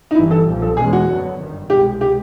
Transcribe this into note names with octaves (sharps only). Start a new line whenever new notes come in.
D#4
G1 G2 E3 G3 E4
A4
B1 A#2 F3
A4
E2 B2 G#3 C#4 G#4
F#4
F#2 D3 F#3 B3
G1 F#2 D#3 G3
C2 B2 G#3 G4
G4